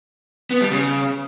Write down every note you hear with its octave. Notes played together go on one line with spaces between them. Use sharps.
B3
G3
C#3